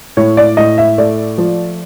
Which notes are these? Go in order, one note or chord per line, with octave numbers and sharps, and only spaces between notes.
A2 C#5
D5
A2 D#5
E5
A3 D5
F3